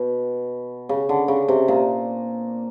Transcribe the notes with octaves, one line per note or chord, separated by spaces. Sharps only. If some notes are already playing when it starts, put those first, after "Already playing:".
Already playing: B2
C#3
D3
C#3
C3
A#2